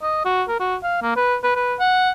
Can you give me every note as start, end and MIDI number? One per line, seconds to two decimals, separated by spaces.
0.02 0.24 75
0.25 0.43 66
0.48 0.57 70
0.59 0.76 66
0.83 1.00 77
1.02 1.15 58
1.16 1.36 71
1.43 1.54 71
1.55 1.75 71
1.79 2.11 78